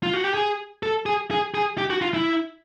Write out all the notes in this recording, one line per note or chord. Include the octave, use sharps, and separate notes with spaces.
F4
F#4
G4
G#4
A4
G#4
G#4
G#4
G4
F#4
F4
E4